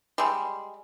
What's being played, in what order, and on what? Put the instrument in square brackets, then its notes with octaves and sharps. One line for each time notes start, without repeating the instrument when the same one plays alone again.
[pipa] G3 G#3